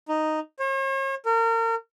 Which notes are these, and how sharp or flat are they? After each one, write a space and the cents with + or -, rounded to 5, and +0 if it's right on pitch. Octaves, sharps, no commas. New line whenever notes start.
D#4 -5
C#5 -45
A#4 -35